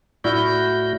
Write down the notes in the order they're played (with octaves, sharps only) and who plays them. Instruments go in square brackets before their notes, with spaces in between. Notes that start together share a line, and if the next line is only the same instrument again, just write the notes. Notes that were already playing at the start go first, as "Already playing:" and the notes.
[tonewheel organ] A2 F#4 G6 [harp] E4 [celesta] D5 F6